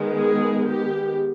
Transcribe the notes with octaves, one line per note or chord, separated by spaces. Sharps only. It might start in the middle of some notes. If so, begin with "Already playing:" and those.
Already playing: D#3 G#3 B3
G#4
G4